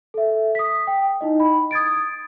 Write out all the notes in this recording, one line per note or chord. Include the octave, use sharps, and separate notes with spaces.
A4 E5
D#6 B6
G5
D#4 E4 D#5
B5
D#6 G#6 A6 D7